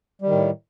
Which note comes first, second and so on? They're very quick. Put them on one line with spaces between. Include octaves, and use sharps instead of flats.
G3 D#3 A2